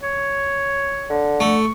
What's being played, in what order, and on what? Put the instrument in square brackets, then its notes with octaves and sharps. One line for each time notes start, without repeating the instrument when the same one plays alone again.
[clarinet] C#5
[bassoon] D3
[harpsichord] A3 [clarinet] C#6